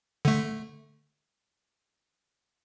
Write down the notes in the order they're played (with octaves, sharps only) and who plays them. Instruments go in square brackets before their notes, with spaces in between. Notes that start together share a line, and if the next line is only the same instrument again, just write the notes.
[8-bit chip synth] D3 A3